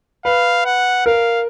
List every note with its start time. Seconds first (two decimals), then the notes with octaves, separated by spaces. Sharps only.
0.25 B4 F5
0.66 F#5
1.06 A#4 F5